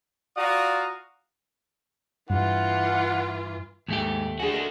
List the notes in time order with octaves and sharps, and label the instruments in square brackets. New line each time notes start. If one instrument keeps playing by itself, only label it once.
[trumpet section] F4 F#4 D5 F5 A#5 D#6
[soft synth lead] G2 [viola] E3 F4 [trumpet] F#5
[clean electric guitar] D#2 A3 G4 [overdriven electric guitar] G#2
[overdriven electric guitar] D4 F#4 [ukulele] G#4 G#5
[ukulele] A4 A#4 D#5